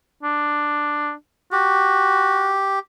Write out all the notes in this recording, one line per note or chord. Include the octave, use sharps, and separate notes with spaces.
D4
F#4 G4